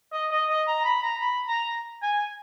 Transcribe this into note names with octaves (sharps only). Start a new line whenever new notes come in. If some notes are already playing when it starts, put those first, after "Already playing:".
D#5
D#5
D#5
A#5
B5
A#5
B5
A#5
G#5